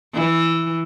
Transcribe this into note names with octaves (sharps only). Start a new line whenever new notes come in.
E3